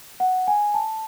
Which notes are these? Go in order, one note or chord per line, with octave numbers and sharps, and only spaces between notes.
F#5
G#5
A5